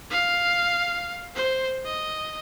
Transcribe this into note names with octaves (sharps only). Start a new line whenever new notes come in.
F5
C5
D#5